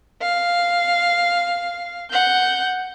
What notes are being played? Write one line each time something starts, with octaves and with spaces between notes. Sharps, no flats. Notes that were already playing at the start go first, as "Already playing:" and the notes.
F5
F#5 G6